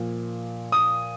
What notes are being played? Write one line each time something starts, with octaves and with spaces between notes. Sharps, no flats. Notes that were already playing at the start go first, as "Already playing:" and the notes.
Already playing: A#2 F3
D#6